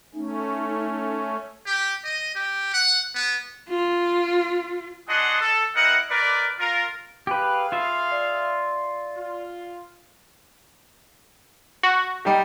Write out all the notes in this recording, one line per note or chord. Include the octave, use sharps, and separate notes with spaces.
A3 C#4 D#4
G4
D#5
G4
F#5
B3
F4
D4 F#4 G#4 D#5 F#5 C6
A4
C4 E4 A#4 D#5 F#5
D#4 A#4 B4 D5
F4 A#4
G4 G#4 B4 F5
F4 E5
D5
F4
F#4
G3 D#4 G4